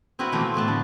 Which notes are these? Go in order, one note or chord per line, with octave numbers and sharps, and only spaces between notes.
C4 E4 F#4 A#4 B4
B2 E3 F3 A3 A#3 C4
A2 A3 B3 A5
D3 F3